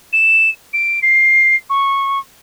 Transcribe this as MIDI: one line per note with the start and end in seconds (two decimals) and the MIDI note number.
0.13 0.50 100
0.74 1.00 98
1.03 1.56 96
1.70 2.19 85